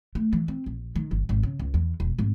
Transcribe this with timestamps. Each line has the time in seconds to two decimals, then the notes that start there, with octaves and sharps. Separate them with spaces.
0.15 A3
0.33 E3
0.48 C4
0.66 A#1
0.96 D#3
1.11 G1
1.29 G#1
1.43 C#3
1.59 C#2
1.74 E2
2.00 E1
2.19 G#1